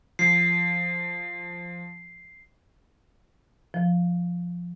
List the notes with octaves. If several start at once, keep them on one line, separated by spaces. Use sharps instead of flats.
F3 C7
F3